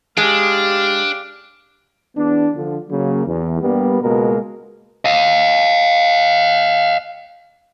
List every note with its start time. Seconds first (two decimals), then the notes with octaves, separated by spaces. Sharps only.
0.17 G#3 D4 G4 F5
2.15 E2 B3 D4
2.56 D3 F3
2.90 C#3 F#3 A#3
3.26 E2
3.61 G2 G3 A#3 B3
4.02 C#2 B2 G#3 A#3 A#4
5.05 D#5 F5